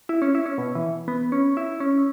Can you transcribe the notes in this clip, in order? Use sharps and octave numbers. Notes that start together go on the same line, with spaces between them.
E4
C#4
E4
C#4
B2
E3
B3
C#4
E4
C#4